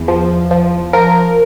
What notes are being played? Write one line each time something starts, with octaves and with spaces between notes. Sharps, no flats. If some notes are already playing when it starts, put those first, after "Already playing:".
Already playing: E2
F3
F3
F3 A#4